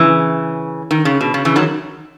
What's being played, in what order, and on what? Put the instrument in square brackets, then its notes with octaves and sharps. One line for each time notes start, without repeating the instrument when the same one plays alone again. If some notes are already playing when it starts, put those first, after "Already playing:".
Already playing: [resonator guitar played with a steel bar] C#3 E3
D#3
C#3
B2
C#3
C#3 E3
D#3 F#3